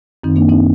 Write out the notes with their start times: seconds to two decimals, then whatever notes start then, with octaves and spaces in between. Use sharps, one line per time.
0.24 F#2 D#3 C4 D#4
0.36 A#3 D4
0.49 C4 D#4